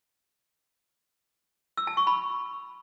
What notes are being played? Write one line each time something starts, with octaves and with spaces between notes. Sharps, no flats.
E6
A5
C#6
B5